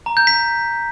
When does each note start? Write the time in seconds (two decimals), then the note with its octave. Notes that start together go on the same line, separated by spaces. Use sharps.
0.06 A#5
0.17 G6
0.27 B6